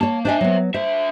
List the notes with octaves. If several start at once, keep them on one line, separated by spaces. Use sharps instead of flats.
A#3 C#5 A5
D4 C5 D#5 E5 G#5
F#3 B3
D4 C5 E5